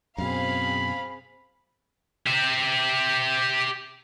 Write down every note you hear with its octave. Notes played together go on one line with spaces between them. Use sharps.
F#2 B2 C4 G#4 F5 B5
G4 E5